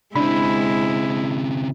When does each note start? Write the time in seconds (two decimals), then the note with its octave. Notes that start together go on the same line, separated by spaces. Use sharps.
0.16 C#3 G#3 C4 D4 E4 B5